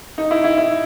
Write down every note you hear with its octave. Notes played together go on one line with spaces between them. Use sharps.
D#4
E4
E4
E4